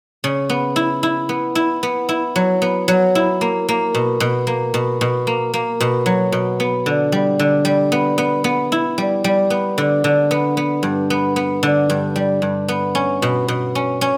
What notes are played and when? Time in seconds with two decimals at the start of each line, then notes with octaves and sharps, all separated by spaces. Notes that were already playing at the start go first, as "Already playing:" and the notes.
0.24 C#3
0.50 B3
0.76 E4
1.03 E4
1.29 B3
1.55 E4
1.83 B3
2.09 E4
2.36 F#3
2.62 B3
2.88 F#3
3.15 E4
3.41 A#3
3.69 A#3
3.94 B2
4.20 B2
4.47 A#3
4.74 B2
5.01 B2
5.27 A#3
5.54 A#3
5.80 B2
6.06 F#3
6.32 B2
6.60 B3
6.86 D3
7.12 G3
7.39 D3
7.65 G3
7.92 B3
8.18 B3
8.44 B3
8.72 E4
8.98 G3
9.24 G3
9.50 B3
9.78 D3
10.04 D3
10.31 B3
10.57 B3
10.83 G2
11.10 B3
11.36 B3
11.63 D3
11.90 G2
12.16 G3
12.42 G2
12.68 B3
12.95 C#4
13.22 B2
13.48 B2
13.75 C#4
14.01 C#4